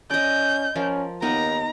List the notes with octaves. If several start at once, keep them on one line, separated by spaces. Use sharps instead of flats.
C#4 D5 D#5 G6
F3 C#4 F4 A#4
D#2 B3 D#4 A#4 A#5